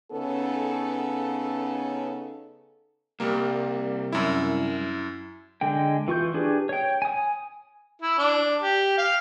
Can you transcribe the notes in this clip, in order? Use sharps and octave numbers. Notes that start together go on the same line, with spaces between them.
C#3 B3 C#4 D#4 A4
C2 G3 A#3
F#2 E4
D3 G#3 G5
E3 F4 C#6 G6
D4 G4 G#4 B4
C#5 G5
G#5 D#6
E4
D4
G4
F5